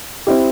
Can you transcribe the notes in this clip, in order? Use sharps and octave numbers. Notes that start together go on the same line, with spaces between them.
C4 E4 G4